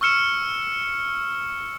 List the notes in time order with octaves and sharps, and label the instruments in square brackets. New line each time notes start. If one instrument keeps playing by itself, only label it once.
[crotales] C#6 E6 F6 C#7 E7